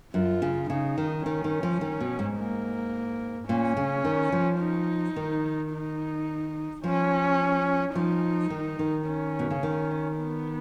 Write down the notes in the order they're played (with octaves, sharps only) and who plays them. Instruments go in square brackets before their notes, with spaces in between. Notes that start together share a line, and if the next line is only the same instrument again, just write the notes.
[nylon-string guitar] F#2 [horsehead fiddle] F4
[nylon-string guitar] C#3
[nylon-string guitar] C#3 [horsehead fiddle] D#4
[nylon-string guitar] D#3
[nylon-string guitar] D#3 [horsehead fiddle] C#4
[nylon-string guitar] D#3
F3
D#3
B2
G#2
[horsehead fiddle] A#3
[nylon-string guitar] A#2 [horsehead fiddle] C#4
[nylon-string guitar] C#3
D#3
F3
[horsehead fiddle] D#4
[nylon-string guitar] D#3
[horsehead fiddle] D#4
[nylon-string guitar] F3 [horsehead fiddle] C#4
[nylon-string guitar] F3 [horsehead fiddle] D#4
[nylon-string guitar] D#3
D#3
[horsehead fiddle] C#4
[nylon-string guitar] B2
C#3
D#3
[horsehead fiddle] B3